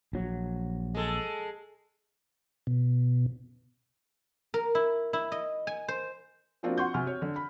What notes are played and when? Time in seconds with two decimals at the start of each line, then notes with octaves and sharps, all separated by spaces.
0.13 A#1 F#3
0.95 G#3 A4
2.67 B2
4.54 A#4
4.75 E4
5.13 E4
5.32 D#5
5.67 G#5
5.88 C5
6.63 F3 A#3 C4 D4 F4 F#4
6.78 F#5 C6 C#6 G6
6.94 C3 F#4 G#5 F6
7.07 C#5
7.22 D3
7.36 B5